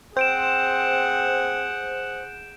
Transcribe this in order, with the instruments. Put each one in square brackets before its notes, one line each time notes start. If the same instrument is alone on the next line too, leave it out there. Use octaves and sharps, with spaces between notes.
[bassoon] C4 [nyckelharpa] G#4 F#5 [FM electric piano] C5 [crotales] G6 D7 E7